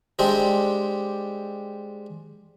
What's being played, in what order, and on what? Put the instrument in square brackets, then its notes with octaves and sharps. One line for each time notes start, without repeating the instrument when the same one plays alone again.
[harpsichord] G3 G#3 C4 D4 G4